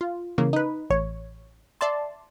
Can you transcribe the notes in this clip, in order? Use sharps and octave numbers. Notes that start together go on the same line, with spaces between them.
F4
C#3 E3 A#3
D#4 B4
A1 C#5
D5 E5 A5 C6